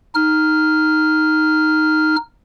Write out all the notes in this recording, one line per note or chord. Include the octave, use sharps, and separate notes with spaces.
D#4 F6